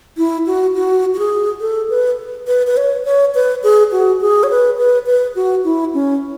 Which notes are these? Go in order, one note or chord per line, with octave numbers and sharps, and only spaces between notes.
E4
F#4
F#4
F#4
G#4
A4
B4
B4
B4
C#5
C#5
B4
G#4
F#4
G#4
C#5
B4
B4
B4
F#4
E4
C#4